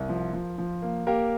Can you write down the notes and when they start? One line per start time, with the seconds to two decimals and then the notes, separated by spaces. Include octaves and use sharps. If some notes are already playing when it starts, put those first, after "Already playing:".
Already playing: C2 A#4
0.09 F3
0.33 F3
0.58 F3
0.82 A#3
1.07 A#3 G4 A#4